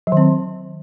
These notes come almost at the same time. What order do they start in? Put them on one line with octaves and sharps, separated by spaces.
F#3 D#3 C4